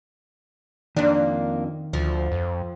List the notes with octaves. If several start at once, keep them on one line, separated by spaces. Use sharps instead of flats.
F2 D#3 A#3 D4 C5
D2 F3
F2